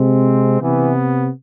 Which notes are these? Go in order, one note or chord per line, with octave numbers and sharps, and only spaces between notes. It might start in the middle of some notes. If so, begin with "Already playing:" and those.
Already playing: C3 G#3 C4
C3 E3 B3